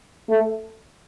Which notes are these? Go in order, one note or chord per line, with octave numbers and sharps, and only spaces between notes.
A3